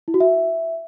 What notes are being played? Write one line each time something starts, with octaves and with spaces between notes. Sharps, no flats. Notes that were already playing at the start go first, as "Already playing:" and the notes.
E4
F#4
E5